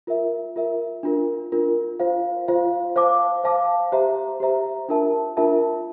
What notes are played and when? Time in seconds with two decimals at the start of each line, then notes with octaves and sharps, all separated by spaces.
0.07 F4 A#4 E5
0.56 F4 A#4 E5
1.03 D4 F4 A#4
1.52 D4 F4 A#4
2.00 F4 C5 F5
2.48 F4 C5 F5
2.96 C5 F5 A5 D6
3.43 C5 F5 A5 D6
3.92 G4 C5 E5 A#5
4.40 G4 C5 E5 A#5
4.89 D4 F4 A#4 E5 A5
5.37 D4 F4 A#4 E5 A5